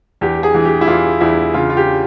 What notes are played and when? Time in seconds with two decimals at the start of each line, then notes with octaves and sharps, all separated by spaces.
0.21 E2 G4
0.43 G#4
0.54 E3
0.65 G4
0.81 E4
0.87 E2 F4
1.21 E2 E4
1.54 C#3 F4
1.70 F4
1.77 G4